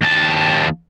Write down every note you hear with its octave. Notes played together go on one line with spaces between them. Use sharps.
D#2 A5